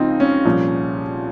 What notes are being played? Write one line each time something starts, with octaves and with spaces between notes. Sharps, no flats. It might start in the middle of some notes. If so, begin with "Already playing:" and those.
Already playing: C#2 C#3 F3 C4 D#4 F4
C#4
C2 A#2 F3